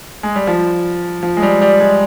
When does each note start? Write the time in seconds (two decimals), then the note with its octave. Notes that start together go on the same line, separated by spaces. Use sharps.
0.23 G#3
0.36 G3
0.47 F3
1.23 F3
1.37 G#3
1.42 G3
1.61 G3
1.80 G#3